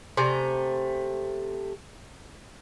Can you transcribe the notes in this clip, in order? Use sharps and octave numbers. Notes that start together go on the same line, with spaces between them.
C3 A3 G#5 A#5